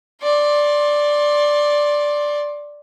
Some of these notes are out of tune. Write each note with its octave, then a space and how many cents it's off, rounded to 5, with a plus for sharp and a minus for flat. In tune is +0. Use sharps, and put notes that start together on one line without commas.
D5 +0 C6 +30